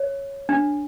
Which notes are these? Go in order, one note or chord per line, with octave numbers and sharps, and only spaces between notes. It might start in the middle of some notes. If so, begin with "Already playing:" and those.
Already playing: C#5
D4